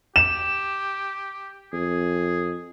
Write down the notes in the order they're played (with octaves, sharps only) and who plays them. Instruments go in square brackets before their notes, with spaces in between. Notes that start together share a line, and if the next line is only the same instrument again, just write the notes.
[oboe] G4 [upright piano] E7
[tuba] F2 [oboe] G#4